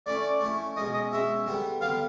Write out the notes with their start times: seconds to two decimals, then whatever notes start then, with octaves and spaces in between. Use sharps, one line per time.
0.07 A3 C#4 E4 D5
0.41 A3 C#4 E4
0.76 B2 G#3 C#4 D#5
0.93 D#5
1.12 B2 G#3 C#4 E5
1.47 D3 G3 B3
1.81 D3 G3 B3 F5